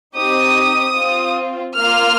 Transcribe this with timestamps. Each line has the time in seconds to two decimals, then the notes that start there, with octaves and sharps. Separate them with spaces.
0.16 C4 D#4 G4 D#6
0.96 C4 F4
1.76 A#3 F4 F6